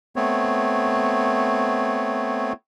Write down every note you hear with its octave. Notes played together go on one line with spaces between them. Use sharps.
A3 B3 C4 C#5